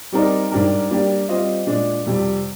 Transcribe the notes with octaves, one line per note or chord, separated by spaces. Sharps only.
G3 C4 D#4 A#4 D5
G#2 G3 D4 G4 A#4
G3 A#3 D4 G4
G3 C4 F4 C5 D#5
A#2 G#3 D4
F2 C3 G3